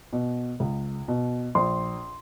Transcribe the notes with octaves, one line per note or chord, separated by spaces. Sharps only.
B2
C#2
B2
A#1 C6